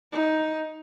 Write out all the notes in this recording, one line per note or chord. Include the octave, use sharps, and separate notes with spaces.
D#4